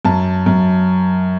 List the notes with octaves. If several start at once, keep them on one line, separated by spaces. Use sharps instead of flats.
F#2 A5
F#2